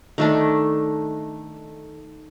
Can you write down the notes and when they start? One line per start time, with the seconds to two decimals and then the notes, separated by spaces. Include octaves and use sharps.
0.18 D#3 A3 D4